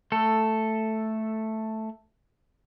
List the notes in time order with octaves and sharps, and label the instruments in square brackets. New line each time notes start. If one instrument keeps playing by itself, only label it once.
[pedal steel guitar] A3 A4